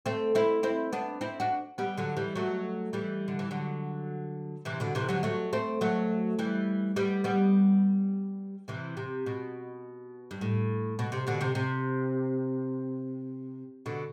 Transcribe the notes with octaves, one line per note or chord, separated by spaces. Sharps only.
A3 C4
C4 E4
C4 E4
B3 D4
C4 E4
D4 F#4
G3 B3
D3 F#3
E3 G3
F#3 A3
E3 G3
D3
E3
D3 F#3
C3 E3
B2 D3
C3 E3
D3 F#3
F#3 A3
A3 C4
F#3 A3
E3 G3
G3 B3
G3 B3
C3 E3
C3
B2
G2
A2
B2
C3
B2 D3
C3
C3
B2 D3